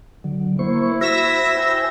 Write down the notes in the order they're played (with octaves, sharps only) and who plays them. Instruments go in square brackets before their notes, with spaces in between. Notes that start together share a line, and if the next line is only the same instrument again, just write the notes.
[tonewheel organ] D3 F#3
[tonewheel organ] A#3 C5 C#6 [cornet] E4
[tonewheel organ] F#4 C5 [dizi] E5 [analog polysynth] E6 A#6
[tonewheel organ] C5 G5 G#5